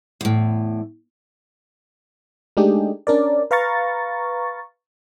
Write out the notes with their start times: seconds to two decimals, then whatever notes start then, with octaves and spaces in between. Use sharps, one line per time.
0.21 E2 A2
2.57 G#3 A3 D4 D#4 G4 G#4
3.07 C#4 D4 A#4 D5
3.51 B4 F5 A#5 C#6 A6